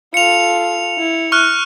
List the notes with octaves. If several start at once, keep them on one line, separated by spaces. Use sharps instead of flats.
F4 A4 C#7 F7
E4
C#6 F6 F#6